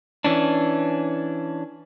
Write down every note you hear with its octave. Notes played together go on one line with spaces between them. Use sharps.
E3 C#4 D4